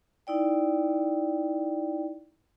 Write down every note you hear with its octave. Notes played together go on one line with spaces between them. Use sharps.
D#4 E4 D5 G5